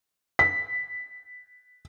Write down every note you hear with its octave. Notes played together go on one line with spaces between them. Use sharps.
B6